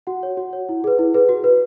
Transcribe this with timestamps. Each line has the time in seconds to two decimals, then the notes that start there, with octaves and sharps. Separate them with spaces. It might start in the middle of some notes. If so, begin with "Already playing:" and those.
0.07 F#4 F#5
0.23 C#5
0.37 F#4
0.53 C#5
0.69 E4
0.84 G#4 B4
0.99 E4
1.14 G#4 B4
1.29 F#4
1.44 B4